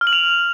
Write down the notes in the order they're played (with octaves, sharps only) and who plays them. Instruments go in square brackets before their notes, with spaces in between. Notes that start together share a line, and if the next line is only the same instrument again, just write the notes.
[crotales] F6
F#7
F7